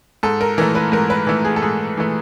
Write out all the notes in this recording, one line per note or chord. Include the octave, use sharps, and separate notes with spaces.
G#2 A4
A#4
E3 A3 A#4
B4
G#2 A#4
B4
E3 A3
G#4
A4
G#2 G#4
E3 A3